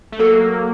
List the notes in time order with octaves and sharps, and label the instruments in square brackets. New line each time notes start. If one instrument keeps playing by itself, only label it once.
[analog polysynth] A3
[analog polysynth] F#3 A#3 [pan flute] A4